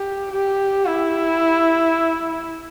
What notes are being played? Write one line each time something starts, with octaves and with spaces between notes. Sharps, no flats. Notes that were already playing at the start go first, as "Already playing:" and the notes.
Already playing: G4
G4
E4